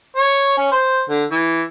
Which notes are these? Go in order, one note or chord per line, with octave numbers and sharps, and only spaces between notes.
C#5
C#4
C5
D3
E3